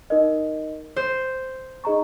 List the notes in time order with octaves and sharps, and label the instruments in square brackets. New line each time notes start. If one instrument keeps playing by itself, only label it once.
[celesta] D#4 A#4 D#5
[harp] C5
[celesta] D#4 G#4 D#5 A#5 C#6